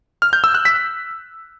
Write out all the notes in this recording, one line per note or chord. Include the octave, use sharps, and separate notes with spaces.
F6
G6
E6
F#6
B6